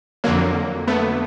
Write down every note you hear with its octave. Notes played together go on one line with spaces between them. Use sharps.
F2 D3 F#3 A#3
A3 B3